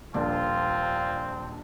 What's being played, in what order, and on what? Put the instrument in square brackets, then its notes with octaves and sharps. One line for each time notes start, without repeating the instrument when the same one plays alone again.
[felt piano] D#1 A#1 D4 [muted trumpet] C4 [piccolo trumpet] F4